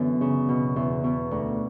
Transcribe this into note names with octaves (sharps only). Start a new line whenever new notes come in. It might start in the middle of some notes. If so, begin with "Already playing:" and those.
Already playing: F#2 D3 E3 B3
C#3
B2
E2
B2
D2